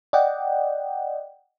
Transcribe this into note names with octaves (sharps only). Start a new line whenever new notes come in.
D5 D#5 F#5 G5